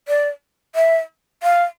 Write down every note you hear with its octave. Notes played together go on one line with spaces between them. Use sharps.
D5
E5
F5